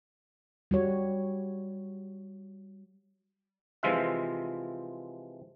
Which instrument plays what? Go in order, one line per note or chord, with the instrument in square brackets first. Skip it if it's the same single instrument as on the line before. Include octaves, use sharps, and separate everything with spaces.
[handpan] G3 F#4 C#5
[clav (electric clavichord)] C3 E3 F3 G#3 F4 E5